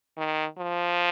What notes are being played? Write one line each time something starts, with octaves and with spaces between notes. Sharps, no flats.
D#3
F3